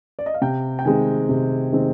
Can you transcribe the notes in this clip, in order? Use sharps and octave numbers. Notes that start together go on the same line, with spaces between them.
D5
D#5
F5
C3 G5
G5
D#3 G#3 C4 G#5
C3
D#3 G#3 C4